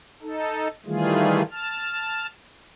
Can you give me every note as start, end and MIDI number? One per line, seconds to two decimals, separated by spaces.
0.22 0.68 63
0.22 0.68 69
0.86 1.42 51
0.86 1.42 52
0.86 1.42 55
0.86 1.42 57
0.86 1.42 65
0.86 1.42 68
1.51 2.26 81
1.51 2.26 89